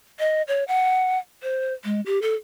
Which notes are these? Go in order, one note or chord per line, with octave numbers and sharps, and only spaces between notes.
D#5
C#5
F#5
C5
G#3
G4
A4